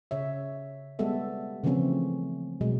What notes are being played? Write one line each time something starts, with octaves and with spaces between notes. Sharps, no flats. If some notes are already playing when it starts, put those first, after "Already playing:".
C#3 C#5 E5
G3 G#3 B3 A4 E5
C#3 E3 F3 A3 C4 C#4
B2 F#3 G#3